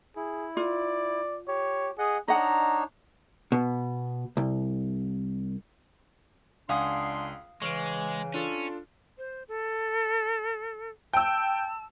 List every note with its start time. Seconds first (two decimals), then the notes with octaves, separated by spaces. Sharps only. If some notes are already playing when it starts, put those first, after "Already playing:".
0.16 E4 G#4
0.57 F4 D5
1.48 G4 C#5
1.99 G#4 D#5 F#5
2.28 D4 D#4 C#5 D#5 F#5 A#5
3.52 B2
4.37 C2
6.69 C#2 D4 F5 F#5 G#5 C6 D#6
7.62 C#3 E3 G#3 C#6 F6 D7
8.34 C#4 D4 F4 A4
9.18 C5
9.48 A4
11.13 G5 A5 E6